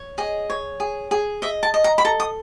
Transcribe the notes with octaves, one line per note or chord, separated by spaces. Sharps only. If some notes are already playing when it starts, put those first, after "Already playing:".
Already playing: C#5
G#4 D#5
C#5
G#4
G#4
D#5 E5
A5
D#5
A#5
B5
A4 A#5
D#6